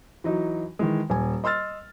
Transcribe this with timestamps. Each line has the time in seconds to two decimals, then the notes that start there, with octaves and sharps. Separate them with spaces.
0.24 E3 F#3 D#4
0.79 D#3 E3 G#3
1.10 D#1 G#5
1.44 D#5 C6 E6 F6 A6